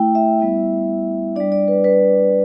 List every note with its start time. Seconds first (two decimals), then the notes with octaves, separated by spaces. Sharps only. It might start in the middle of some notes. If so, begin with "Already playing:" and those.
Already playing: A3 E4 G5
0.15 E5
0.40 G3 B3 E4
1.36 G3 D4 D5
1.52 D5
1.68 B4
1.84 B4